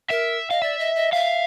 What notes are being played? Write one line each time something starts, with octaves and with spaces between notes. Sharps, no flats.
A#4 E5
D#5 F5
D5 E5
D#5
D#5
E5 F5